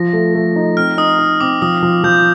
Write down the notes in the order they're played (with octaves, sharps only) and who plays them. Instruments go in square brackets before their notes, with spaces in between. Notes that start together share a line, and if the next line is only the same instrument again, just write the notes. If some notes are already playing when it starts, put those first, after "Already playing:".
Already playing: [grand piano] F3 [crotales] A#6
[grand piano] A3
A3
D#4
[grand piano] C4 [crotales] F6
[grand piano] D#4 [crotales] D#6
[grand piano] D#4
[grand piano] C4 [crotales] D6
[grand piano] F3 [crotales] D#6
[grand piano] F3
[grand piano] F3 [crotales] G6